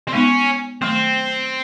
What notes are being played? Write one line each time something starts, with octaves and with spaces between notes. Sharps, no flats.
C4
G#3 B3 C#4 D#4
D#3 F#3 A3 C4